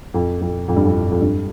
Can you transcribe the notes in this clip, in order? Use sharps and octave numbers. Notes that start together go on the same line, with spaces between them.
F2
F2
F2
G2
F2
F2
G2